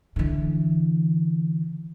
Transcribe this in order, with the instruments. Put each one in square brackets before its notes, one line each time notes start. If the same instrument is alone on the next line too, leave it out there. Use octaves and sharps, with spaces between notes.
[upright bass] D3 E3